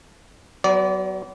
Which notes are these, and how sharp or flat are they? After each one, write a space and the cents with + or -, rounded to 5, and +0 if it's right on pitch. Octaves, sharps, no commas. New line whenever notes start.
F#3 +30 B3 +30 D5 -30